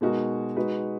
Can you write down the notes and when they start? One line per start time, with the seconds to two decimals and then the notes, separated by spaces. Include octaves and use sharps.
0.01 B2 G#3 D#4 F#4 A#4
0.56 G#3 D#4 F#4 B4